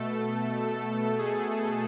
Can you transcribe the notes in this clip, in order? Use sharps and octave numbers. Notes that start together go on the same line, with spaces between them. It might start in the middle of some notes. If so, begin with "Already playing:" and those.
Already playing: B2 A3 A4
A4
A4
G#4